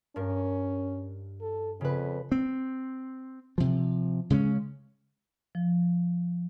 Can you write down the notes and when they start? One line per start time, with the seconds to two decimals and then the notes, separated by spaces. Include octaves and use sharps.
0.16 G2 C#4 A#4
1.42 A4
1.81 F2 C#3 B4
2.32 C4
3.58 C3 F3
4.30 C#3 G#3 A3 C#4
5.55 F3